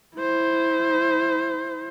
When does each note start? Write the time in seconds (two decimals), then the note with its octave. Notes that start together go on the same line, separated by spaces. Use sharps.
0.17 E4 C5